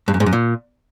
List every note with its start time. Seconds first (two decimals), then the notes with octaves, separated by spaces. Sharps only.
0.08 G2
0.14 F#2
0.20 G#2
0.26 F#2
0.33 A#2